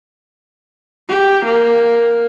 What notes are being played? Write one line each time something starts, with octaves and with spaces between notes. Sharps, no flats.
G4
A#3